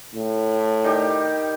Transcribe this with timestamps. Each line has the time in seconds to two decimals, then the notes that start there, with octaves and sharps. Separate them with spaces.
0.14 A2
0.84 D#3 G3 G4